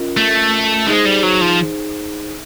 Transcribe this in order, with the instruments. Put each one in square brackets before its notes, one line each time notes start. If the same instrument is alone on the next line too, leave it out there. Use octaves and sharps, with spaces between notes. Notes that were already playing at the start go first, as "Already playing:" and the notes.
Already playing: [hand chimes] C#4 F4 A#4 D#5
[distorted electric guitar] A3
[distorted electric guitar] G#3 [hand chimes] D#4 G#4 C5
[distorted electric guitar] G3
F#3
F3